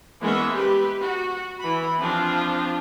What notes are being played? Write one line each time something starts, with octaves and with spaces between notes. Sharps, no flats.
E3 G#3 A#3 B3 C#4 E5
G4 B4
F#4
E3 B5
F3 C4 D4 F4